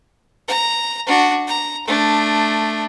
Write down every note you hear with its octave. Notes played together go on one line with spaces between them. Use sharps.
A#5
D4 F#4
A#5
A3 D4